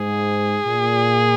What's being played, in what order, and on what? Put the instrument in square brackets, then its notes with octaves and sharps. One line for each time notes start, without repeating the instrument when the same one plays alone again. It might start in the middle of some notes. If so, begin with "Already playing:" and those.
Already playing: [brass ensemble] G#2 [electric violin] G#4
[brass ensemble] A#2